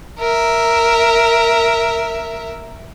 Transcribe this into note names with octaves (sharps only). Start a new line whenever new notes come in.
A#4 E5